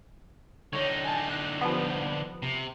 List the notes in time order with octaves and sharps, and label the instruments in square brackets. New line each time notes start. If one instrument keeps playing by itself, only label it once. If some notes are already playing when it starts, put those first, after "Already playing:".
[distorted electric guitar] D3 D#4 [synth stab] C#5
[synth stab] G#5 A5
F#6
F3 G3 B3
[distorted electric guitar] C3